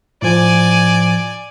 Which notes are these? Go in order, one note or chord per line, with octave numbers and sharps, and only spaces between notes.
A2 F3 D5 G#5